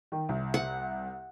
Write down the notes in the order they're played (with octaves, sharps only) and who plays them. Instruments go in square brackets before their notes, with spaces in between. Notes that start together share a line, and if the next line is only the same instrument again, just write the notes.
[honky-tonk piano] D#3
C2
[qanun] F#5